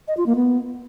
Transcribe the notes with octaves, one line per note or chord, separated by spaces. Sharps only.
D#5
F4
A#3
B3